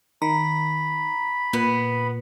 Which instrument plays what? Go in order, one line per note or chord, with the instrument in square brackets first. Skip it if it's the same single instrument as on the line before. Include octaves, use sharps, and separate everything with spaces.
[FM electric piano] D#3 [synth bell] A#5 [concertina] B5
[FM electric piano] A#2 [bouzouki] B3